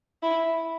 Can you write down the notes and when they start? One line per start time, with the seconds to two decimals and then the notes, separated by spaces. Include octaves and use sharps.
0.23 E4